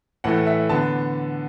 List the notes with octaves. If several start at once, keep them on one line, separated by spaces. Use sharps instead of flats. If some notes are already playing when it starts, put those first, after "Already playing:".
A2 E3 A3 F#5
E5
D3 B3 A5